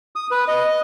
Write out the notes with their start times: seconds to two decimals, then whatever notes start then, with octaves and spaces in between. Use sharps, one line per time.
0.16 D#6
0.31 B4
0.48 D#5